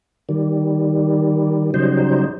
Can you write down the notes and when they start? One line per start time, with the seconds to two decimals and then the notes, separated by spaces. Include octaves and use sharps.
0.29 D#3 G3
1.74 C#3 F#3 G3 D#4 C5